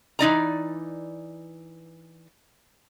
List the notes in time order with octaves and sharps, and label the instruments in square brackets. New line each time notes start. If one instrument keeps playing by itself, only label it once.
[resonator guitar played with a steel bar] E3 D#4 D5 A#5